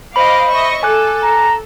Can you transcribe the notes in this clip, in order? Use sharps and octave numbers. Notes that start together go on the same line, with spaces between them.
C5 D#5 F5 B5 D6
D#5 E5 C#6
A4 G#5 D6 F#6
A#5